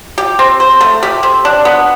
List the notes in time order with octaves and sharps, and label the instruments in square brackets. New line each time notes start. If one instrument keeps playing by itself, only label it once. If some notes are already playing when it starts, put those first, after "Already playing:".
[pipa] G4
C4
C5
A3
G4
C4
D4
B3